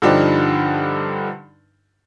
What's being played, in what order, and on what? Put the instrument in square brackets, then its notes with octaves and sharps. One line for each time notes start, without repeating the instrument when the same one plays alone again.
[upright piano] G2 D3 F3 D4 D#4 G4